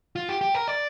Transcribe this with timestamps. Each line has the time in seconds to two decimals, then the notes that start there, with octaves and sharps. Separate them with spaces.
0.16 F4
0.29 G4
0.41 G4
0.54 A#4
0.68 D5